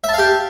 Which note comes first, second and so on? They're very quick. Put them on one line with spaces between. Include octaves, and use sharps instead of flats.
E5 A5 F5 G4